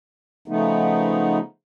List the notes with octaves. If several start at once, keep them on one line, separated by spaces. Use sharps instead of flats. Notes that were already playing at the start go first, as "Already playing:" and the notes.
C#3 F3 A3 B3 D#4